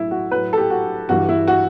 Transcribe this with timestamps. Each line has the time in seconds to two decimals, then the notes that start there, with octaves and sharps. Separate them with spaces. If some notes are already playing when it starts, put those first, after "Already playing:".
Already playing: A2 F#3 E4
0.11 F#4
0.31 A2 F#3 B4
0.53 A4
0.58 G4
0.70 F#4
1.09 G2 E3 G3 F#4
1.29 E4
1.48 F#4